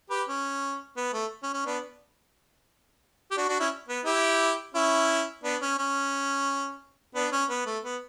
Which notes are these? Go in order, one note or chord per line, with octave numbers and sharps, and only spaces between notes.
G4 B4
C#4
B3
A3
C#4
C#4
B3 D4
G4
D4 F#4
D4 F#4
C#4 E4
B3
E4 G4
C#4 E4
B3 D4
C#4
C#4
B3 D4
C#4
B3
A3
B3